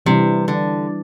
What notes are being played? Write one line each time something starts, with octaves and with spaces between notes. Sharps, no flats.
C3 E3 G3 D4
D3